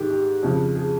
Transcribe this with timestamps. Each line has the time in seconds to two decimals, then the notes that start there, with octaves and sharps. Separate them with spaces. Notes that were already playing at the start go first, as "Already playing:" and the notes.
Already playing: G#2 D#3 G4
0.10 G4
0.43 F2 C#3 F3
0.75 G#4